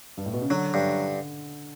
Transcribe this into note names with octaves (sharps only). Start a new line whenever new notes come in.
G2
A2
B2
C#3
D3 F#3
G2